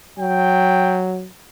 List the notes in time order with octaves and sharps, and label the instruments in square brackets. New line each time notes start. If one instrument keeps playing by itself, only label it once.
[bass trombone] F#3 [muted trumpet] G5